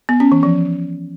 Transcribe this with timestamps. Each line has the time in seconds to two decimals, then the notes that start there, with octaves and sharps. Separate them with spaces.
0.09 B3
0.20 C#4
0.32 E3
0.43 F3